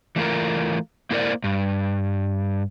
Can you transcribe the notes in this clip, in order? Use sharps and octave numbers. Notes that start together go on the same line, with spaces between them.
E3 A3 F4 A#4
A#3 E4 A#4 C5 D5
G2